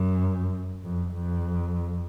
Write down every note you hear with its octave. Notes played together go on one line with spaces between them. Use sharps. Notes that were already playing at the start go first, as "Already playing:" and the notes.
Already playing: F#2
F2
F2